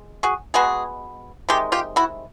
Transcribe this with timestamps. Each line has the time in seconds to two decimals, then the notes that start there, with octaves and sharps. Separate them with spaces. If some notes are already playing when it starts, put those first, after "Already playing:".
Already playing: G#3
0.23 F#4 G#4
0.54 B2 G#3 B3 F#4 G#4
1.49 C3 D#3 G#3 G4
1.72 F4 G4
1.96 E4 F#4